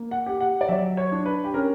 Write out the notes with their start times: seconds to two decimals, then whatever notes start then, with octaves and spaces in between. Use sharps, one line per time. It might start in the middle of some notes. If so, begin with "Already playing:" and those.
Already playing: A#3
0.11 F#5
0.26 G4
0.41 F#5
0.61 D5
0.69 F#3 E5
0.97 C#5
1.12 D4
1.26 B4
1.44 G4
1.54 C#4 A#4